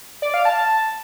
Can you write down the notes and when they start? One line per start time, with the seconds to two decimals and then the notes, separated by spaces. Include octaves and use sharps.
0.22 D5
0.34 F5
0.45 A5